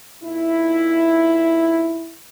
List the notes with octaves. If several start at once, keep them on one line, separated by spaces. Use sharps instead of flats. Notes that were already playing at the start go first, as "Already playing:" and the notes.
A#2 D#4 E4